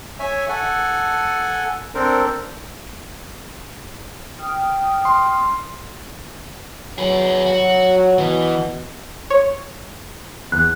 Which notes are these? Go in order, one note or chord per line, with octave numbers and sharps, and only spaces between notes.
C#5 E5 G#5
A4 F#5 G#5
C4 D4 A4 A#4 C5
G5 D#6 F6
C6
F#3 G#4 B4
F#4
B2 E3
C#5
E2 F#6